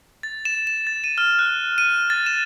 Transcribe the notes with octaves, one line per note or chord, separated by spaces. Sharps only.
A6
E7
E7
A6
D#7
F6
F#6
D#7
A6
E7